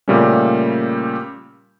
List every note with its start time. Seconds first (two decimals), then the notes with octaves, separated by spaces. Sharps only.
0.08 A#2 C#3 G3 A3 A#3 C#4